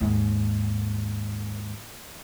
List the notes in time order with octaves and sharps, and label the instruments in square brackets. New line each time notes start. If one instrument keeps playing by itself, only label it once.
[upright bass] D#2 G#2